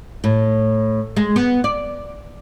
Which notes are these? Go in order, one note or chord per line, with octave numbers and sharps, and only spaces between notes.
A2
G#3
B3
D5